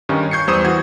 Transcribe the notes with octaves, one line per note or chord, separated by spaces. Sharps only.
G2 D#3 G3 C#4 D#4
C#6 G6 G#6 C7 C#7
E2 G3 C5 C#6 D#6 E7
E3 F#4 G#6